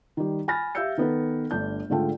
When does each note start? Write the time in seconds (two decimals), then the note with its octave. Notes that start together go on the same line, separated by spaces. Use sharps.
0.17 D#3 G3
0.48 G#5 B5 F6 A6 A#6
0.75 G4 E5 F5 E6 G6 C#7
0.98 D#3 B3 A4 B4
1.51 G1 A3 D4 G6
1.90 G#2 D3 A3 F4 G5